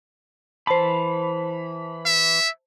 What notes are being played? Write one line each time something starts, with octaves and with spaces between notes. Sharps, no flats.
E3 C5 A5 B5
E5